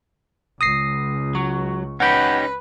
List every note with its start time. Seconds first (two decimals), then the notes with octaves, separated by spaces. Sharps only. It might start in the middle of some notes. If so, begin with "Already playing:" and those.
0.61 C#2 D#6 A#6 C7
1.35 F#3 C#6
2.00 C#4 D#4 G4 B4 F#5 G6